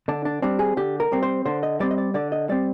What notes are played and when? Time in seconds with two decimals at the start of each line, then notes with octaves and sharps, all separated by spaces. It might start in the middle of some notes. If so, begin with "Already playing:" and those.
0.08 D3 D4
0.25 D4
0.42 G3 C4 D4
0.59 G#4
0.77 D3 G4
1.00 A#4
1.12 G3 C4
1.23 C5
1.45 D3 C5
1.63 D#5
1.80 G3 C4 D5
1.91 D#5
1.98 D5
2.14 D3 D5
2.32 D#5
2.49 G3 C4 D5